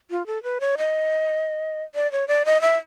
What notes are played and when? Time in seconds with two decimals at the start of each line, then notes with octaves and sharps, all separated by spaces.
0.10 F4
0.27 A4
0.43 B4
0.60 C#5
0.78 D#5
1.95 D5
2.12 C#5
2.28 D5
2.45 D#5
2.61 E5